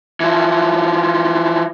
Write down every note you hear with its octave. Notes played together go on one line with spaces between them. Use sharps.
E3 F3